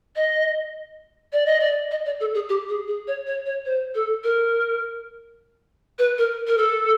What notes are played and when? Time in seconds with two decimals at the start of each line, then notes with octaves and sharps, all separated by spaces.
0.16 D#5
1.33 D5
1.46 D#5
1.60 D5
1.91 D#5
2.05 D5
2.20 A4
2.34 G#4
2.49 G4
2.69 G#4
2.88 G#4
3.08 C#5
3.27 C#5
3.46 C#5
3.66 C5
3.95 A4
4.24 A#4
5.99 B4
6.18 A#4
6.47 A#4
6.58 A4